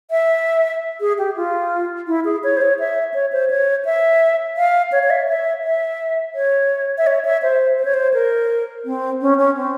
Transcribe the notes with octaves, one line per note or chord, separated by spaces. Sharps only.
E5
G#4
G4
F4
E4
G#4
C#5
C5
C#5
E5
C#5
C5
C#5
E5
F5
C#5
C#5
E5
E5
E5
C#5
E5
C#5
E5
C5
C5
C#5
C5
A#4
C4
C#4
C#4
C4